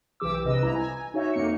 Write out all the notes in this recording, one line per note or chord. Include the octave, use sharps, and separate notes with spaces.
B1 E3 G4 D6 E6
A#1 C3 B4 D#5 E6
C2 E4 A#5
G#5
D#4 F#4 C#5 E5
F2 A#3 D#4 C#7